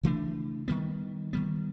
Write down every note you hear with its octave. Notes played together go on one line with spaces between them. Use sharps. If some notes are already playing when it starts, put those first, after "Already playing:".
C#3 E3 A3 D4
D#3 G3 B3
D#3 G3 B3